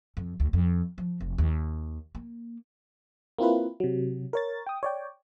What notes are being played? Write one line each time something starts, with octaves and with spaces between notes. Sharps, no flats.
F2
D2
F2
F3
F1
D#2
A#3
A#3 C4 E4 F4 B4
C3 F#3
A#4 C#5 A6
G5 D#6
C#5 D5 G5